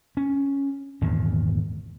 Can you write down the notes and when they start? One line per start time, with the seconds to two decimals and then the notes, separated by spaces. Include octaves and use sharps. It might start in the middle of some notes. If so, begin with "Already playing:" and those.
0.17 C#4
1.01 G#1 E2 A#2 D3